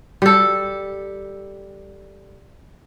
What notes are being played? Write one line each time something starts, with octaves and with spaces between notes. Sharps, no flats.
G3 A4